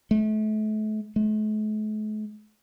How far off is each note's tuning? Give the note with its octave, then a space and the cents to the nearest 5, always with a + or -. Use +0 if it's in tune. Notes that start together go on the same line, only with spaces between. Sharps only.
A3 -35
A3 -45